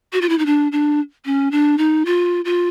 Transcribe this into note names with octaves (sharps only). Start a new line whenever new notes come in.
F#4
F4
E4
D#4
D4
D4
C#4
D4
D#4
F4
F4